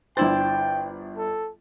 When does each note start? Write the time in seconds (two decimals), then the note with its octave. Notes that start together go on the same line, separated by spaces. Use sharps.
0.17 G1 D4 E4 C5 G5 A6
1.17 A4